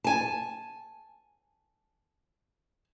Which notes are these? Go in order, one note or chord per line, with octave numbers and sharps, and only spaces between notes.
G#5 A5